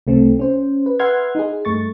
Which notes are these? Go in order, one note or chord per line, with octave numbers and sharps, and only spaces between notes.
C2 A3 C4
C#4 C5
B4
B4 E5 F#5 C6 F6 G#6
D#4 G#4
G2 A3 C#6 A6